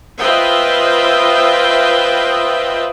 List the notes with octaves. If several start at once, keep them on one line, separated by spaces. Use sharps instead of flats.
F4 B4 C5 D#5 E5 G5